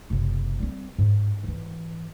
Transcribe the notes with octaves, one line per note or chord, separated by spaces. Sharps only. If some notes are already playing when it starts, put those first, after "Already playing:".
F#1 C3
G3 C4
G#2
G#2 E3